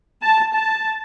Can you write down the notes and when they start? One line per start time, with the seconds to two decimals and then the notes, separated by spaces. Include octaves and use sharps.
0.22 A5
0.52 A5